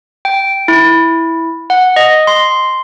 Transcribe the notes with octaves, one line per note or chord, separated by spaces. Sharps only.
G5
E4
F#5
D#5
C6